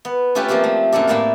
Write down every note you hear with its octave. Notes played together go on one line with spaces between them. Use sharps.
B3
A3 C#4 F4 G4 A4 B4
F3 A#3 C4 G4 D5
A3
F#2 A#2 A#3 A4 D5
A2 A#3 E4 D5 G5